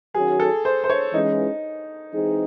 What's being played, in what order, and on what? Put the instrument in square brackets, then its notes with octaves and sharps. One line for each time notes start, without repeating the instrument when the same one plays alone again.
[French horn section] D#3 F#3 C#4 F#4 [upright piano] G#4
[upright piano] A4
C5
C5
C#5
[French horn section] E3 G#3 C#4 [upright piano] D#4
[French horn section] E3 G#3 C4 D#4 G#4